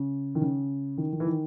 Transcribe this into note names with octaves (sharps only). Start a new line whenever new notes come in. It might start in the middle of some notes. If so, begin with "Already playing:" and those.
Already playing: C#3
D#3
C#3
D#3
D#3
E3
D#3